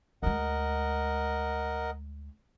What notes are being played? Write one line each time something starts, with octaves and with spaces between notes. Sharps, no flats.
D2 G#3 A#4 D#5 F#5